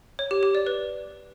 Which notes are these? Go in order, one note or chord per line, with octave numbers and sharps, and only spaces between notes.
C#5
G4
G4
D5
B4